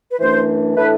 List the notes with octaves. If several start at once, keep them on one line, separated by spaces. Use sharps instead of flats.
B4
F#2 E3 A3 D4 C5
A2 E3 A3 D4 B4